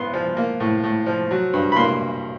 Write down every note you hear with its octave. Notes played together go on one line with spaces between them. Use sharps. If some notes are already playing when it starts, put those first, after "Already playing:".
Already playing: G#2 B3 C6
F3
A#3
A2
A2
F3
F#3
G2
B5
A#3 C6